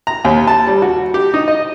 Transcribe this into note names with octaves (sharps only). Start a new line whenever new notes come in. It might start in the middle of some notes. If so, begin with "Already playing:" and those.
A#5
D#2
A5
G3
F#4
G4
D#4
D#5